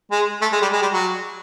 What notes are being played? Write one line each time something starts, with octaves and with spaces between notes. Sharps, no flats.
G#3
A3
G#3
G3
G#3
G3
F#3